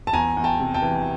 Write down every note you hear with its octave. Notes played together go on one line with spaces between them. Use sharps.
A5
E2 G#5 A#5
E2
G5 A5
C3
G5 A5
E3